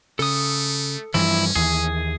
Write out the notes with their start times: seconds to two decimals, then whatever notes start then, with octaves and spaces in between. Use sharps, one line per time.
0.19 C#3 A3 A4 D#6
1.14 G2 E3 F3 C#4 E4
1.56 D#2 E3 G#4